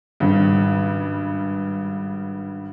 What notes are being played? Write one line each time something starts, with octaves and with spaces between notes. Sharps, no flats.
G#1 G2 C#3